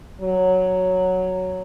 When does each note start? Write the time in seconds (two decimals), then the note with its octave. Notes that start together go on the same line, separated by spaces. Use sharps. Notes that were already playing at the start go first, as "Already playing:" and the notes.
0.21 F#3